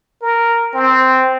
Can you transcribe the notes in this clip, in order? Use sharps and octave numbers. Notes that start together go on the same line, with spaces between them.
A#4
C4